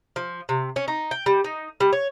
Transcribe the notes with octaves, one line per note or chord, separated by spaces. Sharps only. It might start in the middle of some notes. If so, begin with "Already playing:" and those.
F3
C3
C#4
D#4
G5
G3
D#4
G3
C#5